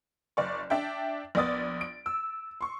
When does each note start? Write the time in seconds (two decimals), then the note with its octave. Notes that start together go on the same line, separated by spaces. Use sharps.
0.37 F#1 D5 C#6
0.70 D4 E5 G5
1.35 A#1 B3 D5 D#6 A6
1.81 D7
2.06 E6
2.61 C6 C#6